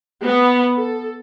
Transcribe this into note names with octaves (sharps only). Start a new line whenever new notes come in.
B3
A4